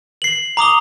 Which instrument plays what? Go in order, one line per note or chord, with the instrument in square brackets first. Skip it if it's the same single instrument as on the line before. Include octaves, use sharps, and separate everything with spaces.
[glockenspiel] C7 F#7
A#5 D6 D#6 G7